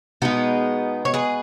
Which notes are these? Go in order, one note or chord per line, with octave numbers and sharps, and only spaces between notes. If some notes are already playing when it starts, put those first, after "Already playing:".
B2 G#3 B3 D#4
C#5
G#4 B4